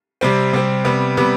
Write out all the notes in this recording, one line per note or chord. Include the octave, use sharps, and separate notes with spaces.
C3 G3 C4
C3 G3 C4
C3 G3 B3
C3 G3 B3